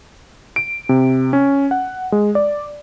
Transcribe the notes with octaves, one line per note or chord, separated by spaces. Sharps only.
D7
C3
C#4
F#5
G#3
D5